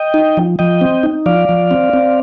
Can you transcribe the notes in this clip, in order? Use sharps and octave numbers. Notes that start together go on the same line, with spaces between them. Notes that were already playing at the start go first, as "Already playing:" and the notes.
Already playing: D#5 G5
D#4
F3
F3 D#5 G5
C4
D#4
F3 D5 F5
F3
C4
C4